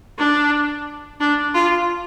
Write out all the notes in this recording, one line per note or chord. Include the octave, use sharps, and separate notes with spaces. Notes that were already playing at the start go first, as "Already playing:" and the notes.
D4
D4
F4